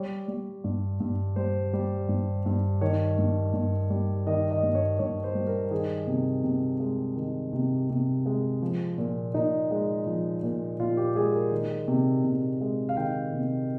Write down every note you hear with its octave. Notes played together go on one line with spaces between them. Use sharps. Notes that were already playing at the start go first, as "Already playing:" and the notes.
Already playing: G3 C#5
G3
G2
G2
G3 C5
G3
G2
G2
D#3 C#5
G2
G2
G3
D#3 D#5
D#5
G2
C#5
G2 C#5
C5
G3
A#4
D#3 G#4
C3
C3
G#3
D#3
C3
C3
G#3
F3
A#2
A#2 D#4
G#3
F3
A#2
A#2 F4
G4
G#3 G#4
A#4
D#3
C3
C3
G#3
F5
D#3 G5
C3